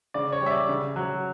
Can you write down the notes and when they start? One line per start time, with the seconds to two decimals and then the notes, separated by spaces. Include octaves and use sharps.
0.14 C#3 D5
0.32 C#5
0.41 G3
0.46 E5
0.51 D5
0.69 C#3
0.96 F#3